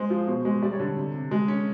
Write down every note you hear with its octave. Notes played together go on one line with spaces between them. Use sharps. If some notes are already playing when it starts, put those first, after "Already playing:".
Already playing: G#3 C5
F3
B2 C5
G#3
G3 D5
C#5
D3
C3
C3
G#3
C#4